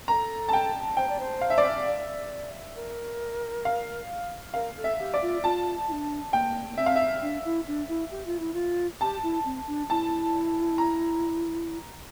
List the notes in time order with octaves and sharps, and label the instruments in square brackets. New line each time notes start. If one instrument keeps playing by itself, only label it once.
[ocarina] A4 A#4 [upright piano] A#5
[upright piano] A5
G5
[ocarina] C5 [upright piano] G5
[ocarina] D5
C5
[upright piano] F5
E5
D5
E5
[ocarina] D5
A#4
[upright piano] F5
[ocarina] A#4 [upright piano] F5
[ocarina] A4
[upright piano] E5
[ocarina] G4
[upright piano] D5
[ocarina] F4
[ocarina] F4 [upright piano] A5
[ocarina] E4
D4
[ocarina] A#3 [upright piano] G5
[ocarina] A#3
[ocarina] C4 [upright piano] E5
[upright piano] F5
E5
[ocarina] D4
E4
D4
E4
G4
F4
E4
F4
[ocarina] G4 [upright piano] A5
[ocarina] E4
C4
D4
[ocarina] E4 [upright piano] A5
[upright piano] A#5